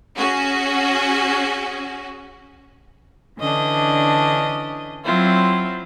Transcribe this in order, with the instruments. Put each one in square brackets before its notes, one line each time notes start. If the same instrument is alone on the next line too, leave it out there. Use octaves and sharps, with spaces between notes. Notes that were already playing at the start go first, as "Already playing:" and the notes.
[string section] C#4 F#4 G#4
[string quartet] D3 E3 C#4 D4 D#5
F#3 C4 E4 F4